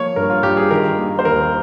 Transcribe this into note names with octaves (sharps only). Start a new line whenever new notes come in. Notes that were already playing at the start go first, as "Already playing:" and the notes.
Already playing: F3 A#3 C#5
G2 A#4
F4
G2 G4
G#4
D#3 A#4
A#3
C5
D#2 A#4